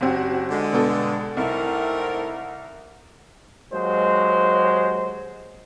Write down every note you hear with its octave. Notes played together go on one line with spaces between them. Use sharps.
F#1 C4 F#4 G4
D3 G#3
G2 B2 A4
C2 A3 C4 D#4 E4 A#4
D#2 F#3 G#3 C5